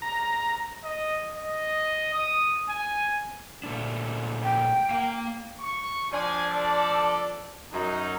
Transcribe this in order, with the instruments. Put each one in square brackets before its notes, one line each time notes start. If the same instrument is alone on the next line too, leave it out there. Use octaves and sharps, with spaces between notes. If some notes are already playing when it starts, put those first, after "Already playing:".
[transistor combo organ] A#5
[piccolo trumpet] D#5
D#5
D#6
G#5
[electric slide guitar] A#2 A3 D4
[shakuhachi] G5
[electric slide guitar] A#3 F5
[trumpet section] C#6
[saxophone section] F3 D4 [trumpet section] G#5
[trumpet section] A4 D5
[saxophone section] F#2 [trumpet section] D#4